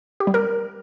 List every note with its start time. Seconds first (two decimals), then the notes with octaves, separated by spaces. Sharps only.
0.20 G4
0.27 G3
0.34 A#4